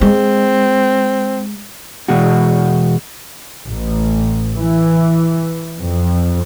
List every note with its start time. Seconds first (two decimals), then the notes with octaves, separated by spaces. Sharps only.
0.01 G#3 C4
2.08 E2 B2 G#3 F#4
3.68 A1
4.54 E3
5.78 F2